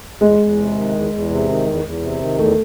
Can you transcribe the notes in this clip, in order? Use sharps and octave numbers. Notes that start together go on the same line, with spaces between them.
E2 G#3
E2
C3
D#3
E2
E2
C3
D#3
E2
E2
C3
D#3
E2 A3